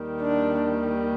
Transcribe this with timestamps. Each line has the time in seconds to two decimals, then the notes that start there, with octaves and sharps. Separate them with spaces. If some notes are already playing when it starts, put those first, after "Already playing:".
Already playing: D#2 D#3 G3
0.19 D4